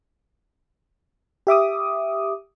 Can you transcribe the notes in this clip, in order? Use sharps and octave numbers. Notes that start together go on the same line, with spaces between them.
G4 E5 D6 D#6